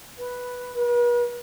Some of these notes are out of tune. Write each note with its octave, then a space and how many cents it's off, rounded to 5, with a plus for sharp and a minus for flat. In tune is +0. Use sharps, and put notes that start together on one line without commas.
B4 -5
B4 -45